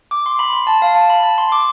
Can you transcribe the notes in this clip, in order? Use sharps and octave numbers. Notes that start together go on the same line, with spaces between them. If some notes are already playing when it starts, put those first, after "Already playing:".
D6
C6
B5
C6
A5
F5
A5
B5
A5
C6
D6